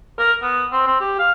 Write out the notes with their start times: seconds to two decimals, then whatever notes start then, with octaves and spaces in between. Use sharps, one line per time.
0.19 A#4
0.42 B3
0.72 C4
0.87 C4
1.01 G4
1.19 F5